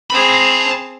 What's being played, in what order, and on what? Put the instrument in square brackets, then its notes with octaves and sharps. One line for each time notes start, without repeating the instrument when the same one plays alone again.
[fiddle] C4 G#4 [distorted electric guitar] A5 B5